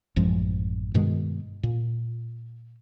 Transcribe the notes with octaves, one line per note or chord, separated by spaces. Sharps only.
A1 F#2 F3 G#3
G2 B2 D#3 G#3
A#2